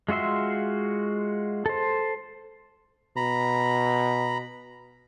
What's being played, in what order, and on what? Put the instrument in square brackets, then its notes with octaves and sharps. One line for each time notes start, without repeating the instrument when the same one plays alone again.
[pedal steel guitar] G#3 F4 F#4 E5 C6
A4 C5
[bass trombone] B2 [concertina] A#5 B5